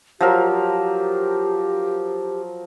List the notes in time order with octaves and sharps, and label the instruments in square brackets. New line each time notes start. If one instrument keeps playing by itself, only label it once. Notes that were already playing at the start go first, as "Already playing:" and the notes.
[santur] F3 F#3 A#4 [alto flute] G4